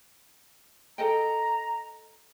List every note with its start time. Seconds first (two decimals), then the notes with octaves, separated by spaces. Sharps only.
0.98 A4 D#5 G5 A#5